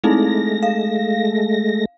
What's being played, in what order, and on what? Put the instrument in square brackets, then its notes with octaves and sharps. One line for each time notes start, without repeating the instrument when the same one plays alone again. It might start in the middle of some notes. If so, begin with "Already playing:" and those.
[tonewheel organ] G#3 A3 A#6 [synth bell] C4 D#4 E4
[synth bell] F5